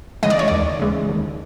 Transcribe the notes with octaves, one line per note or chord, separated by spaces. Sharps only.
C#3 E3 G#3 D#5
D5
C#5
D#2 D5
C#3 E3 G#3
D#2